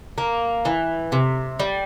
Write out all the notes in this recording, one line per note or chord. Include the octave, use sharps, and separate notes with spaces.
A#3
E3
C3
G3